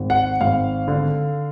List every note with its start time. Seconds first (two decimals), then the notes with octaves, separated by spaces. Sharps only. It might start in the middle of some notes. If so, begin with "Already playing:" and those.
Already playing: G#1
0.10 F#5
0.41 G#1 F5
0.88 D3